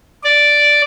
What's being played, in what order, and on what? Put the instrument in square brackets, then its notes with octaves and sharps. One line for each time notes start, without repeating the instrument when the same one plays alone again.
[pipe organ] D5